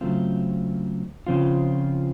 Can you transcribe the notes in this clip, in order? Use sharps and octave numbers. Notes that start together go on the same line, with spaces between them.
C#3 F#3 A3 C4 F4
C#3 F3 C4 F4